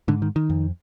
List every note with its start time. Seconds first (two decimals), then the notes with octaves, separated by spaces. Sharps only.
0.08 G#2 D3
0.22 D#3
0.36 D#3
0.50 F2